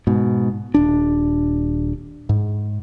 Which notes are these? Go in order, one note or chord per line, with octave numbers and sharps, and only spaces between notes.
G#2 B2
D#1 D4
G#2